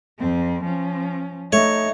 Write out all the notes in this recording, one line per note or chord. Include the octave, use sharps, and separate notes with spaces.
F2 C4
F3 C#4
A3 D#4 C#5